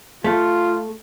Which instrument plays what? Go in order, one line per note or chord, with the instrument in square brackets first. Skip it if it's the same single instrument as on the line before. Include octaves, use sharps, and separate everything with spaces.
[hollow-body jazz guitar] A3 [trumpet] F4